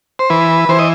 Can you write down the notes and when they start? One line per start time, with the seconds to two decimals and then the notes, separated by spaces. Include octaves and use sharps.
0.19 C5
0.30 E3 B4
0.69 E3 C5
0.79 D#5